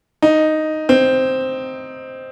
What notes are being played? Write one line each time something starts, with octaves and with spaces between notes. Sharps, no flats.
D#4
C4